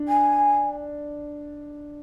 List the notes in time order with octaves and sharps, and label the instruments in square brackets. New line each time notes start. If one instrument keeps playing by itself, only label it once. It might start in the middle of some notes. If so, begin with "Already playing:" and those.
Already playing: [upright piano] D4
[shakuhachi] G#5